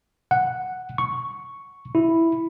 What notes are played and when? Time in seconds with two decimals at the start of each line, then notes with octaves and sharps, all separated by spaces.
0.31 F#5
0.98 C#6
1.95 E4